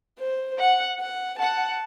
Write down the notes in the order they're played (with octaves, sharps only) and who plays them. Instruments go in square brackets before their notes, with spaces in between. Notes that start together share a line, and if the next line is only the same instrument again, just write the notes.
[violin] C5
[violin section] F#5
[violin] F#5
[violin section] F#5 [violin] A5